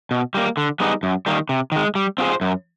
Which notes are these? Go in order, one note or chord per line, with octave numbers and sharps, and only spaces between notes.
B2
G3 A#3
D3
G3 B3 D#4 G#4
F#2
D#3 G3 A#3
C3
D#3 G#3
G3
C4 F4 G#4 C5
F#2